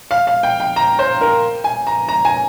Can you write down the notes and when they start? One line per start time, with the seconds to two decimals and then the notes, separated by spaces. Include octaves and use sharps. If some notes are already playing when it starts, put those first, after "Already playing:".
0.11 F5
0.27 F5
0.43 G5
0.60 G5
0.76 A#5
0.99 C5
1.21 A#4
1.64 G#5
1.87 A#5
2.08 A#5
2.25 G#5